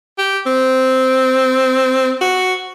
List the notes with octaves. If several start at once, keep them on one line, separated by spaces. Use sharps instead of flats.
G4
C4
F#4